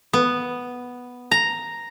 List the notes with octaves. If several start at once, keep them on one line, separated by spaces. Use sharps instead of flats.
B3
A#5